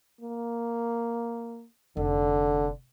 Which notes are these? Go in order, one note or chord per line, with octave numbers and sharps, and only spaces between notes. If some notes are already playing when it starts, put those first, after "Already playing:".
A#3
F1 D3